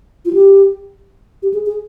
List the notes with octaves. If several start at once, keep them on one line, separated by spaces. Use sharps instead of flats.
F4
G4
G4
G#4
G#4